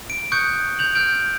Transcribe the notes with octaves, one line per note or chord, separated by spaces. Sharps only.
D7
C#6 D#6 F#6 G6 C#7
G6 F7 F#7
F6 G6 D7